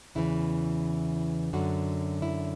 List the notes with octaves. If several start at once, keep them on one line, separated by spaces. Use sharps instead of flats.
E2 C#3 E3 E4
F#2 D3 F#4
E4